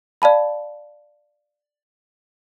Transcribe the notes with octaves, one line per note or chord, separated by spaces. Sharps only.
D5 F5 A5 B5